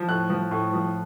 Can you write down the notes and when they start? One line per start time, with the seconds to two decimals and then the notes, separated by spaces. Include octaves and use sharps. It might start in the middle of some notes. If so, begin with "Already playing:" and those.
Already playing: F3
0.08 A2 F#6
0.30 F3
0.51 A2
0.73 F3